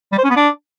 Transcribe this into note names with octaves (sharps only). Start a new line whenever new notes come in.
G3
C5
C#4
B3
D4